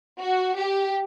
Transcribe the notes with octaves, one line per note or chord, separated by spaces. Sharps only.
F#4
G4